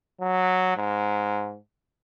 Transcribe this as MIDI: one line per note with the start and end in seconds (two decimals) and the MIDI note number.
0.21 0.75 54
0.76 1.57 44